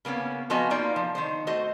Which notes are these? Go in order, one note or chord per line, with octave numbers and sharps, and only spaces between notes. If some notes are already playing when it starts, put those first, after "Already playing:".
C#3 A#3 B3 C#4
F3 B3 C#4 F#4 D#5 G#5
A#3 B3 D#4 F4 D5
F3
D#3 D#4 C5
A3 F#4 C5 D#5